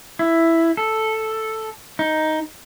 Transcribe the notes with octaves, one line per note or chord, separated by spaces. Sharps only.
E4
A4
D#4